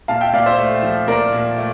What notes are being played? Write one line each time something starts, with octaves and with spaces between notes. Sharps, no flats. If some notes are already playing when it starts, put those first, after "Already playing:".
A#2 F5 A5
E5 G5
A#2 D5 F5
C5 E5
A3
F3
A#2 A#4 D5
A#2
A3